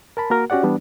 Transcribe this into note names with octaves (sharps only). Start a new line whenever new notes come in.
A#4 A5 B5
A#3 F#4 A#4
C#4 F#4 G4 D5 F#5
E3 G3 B3 D4